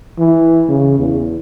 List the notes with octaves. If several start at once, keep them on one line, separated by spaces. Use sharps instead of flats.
E3
C#3
E2